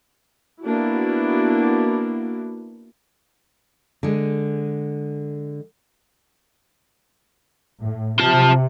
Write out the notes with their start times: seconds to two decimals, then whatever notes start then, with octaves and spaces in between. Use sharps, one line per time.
0.62 A#3 B3 D4 E4 F#4
4.03 D3 G#3
7.81 A2
8.19 C3 F4 A5